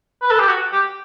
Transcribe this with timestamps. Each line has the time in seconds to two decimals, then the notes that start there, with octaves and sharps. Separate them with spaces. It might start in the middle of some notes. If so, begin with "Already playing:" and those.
0.22 B4
0.31 A4
0.39 G4
0.48 F#4
0.72 G4